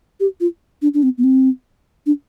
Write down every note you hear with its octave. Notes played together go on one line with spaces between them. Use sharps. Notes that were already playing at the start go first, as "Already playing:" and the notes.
G4
F4
D4
D4
C4
B3
C4
D4